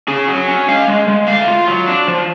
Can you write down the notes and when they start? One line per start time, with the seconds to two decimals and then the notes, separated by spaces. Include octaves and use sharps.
0.08 C#4 G#4
0.28 F#3
0.48 C#4
0.68 G#3 F5
0.88 G#3
1.08 G#3
1.28 A3 F5
1.48 F4
1.68 F#3
1.88 D4
2.08 F3